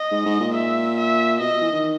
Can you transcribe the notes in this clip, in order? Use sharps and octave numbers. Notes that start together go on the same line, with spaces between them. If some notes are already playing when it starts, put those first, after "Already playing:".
Already playing: D#5
G#2
G#2
A#2
E5
E5
B2 D#5
E3
D#3